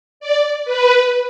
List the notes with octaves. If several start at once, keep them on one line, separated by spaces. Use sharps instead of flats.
D5
B4